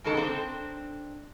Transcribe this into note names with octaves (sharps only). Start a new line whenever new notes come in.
C#3 E3 G#3 D#4 A4
C4 D4